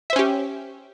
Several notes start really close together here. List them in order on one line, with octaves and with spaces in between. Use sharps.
E5 C5 C#4 G4